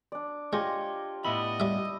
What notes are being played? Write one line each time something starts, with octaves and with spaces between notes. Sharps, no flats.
D4 D5
G#3 F4 G4 C#5 D#5
A2 B3 E4 D#5 B5
G3 E5